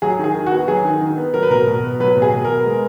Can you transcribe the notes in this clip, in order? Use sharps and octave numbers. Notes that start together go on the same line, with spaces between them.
F#3 G#4
D#3 G#4
D#3
F#4
B3
F#3 G#4
D#3
D#3
B3
F#3 A#4
B4
B2 A#4
B2
B3
F#3 B4
B2
G#4
B2
B3 A#4
G#3